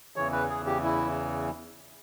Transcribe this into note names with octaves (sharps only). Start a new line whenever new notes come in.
E2 C#3 E3 C#5
B4
G#4
G4
E4